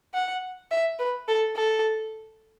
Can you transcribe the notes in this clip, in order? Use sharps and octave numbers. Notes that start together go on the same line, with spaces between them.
F#5
E5
B4
A4
A4